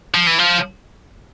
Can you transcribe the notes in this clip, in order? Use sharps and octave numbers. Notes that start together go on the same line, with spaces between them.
F3
E3
F3